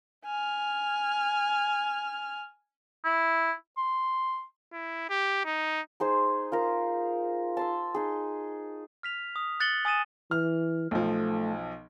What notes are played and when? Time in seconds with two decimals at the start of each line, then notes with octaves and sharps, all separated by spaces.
0.25 G#5 F6
3.05 E4
3.77 C6
4.73 E4
5.09 G4
5.45 D#4
6.00 D#4 G#4 C5
6.52 F4 A#4 A#5
7.57 A5 C6 E6
7.95 D#4 G#4
9.03 F6 B6 F7
9.36 D#6
9.60 F#6 A6 C#7 F#7 G7
9.85 G#5 D#6 A6 D#7 E7
10.31 E3 F6
10.91 B1 F3 A3